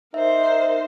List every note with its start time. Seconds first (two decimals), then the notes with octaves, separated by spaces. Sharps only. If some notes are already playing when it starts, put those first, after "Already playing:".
0.14 D#4 A#4 C5 E5